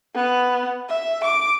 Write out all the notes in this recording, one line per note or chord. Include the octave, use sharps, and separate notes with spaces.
B3
E5
D6